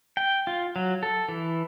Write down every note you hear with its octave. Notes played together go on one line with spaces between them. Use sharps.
G5
F4
F#3
A4
E3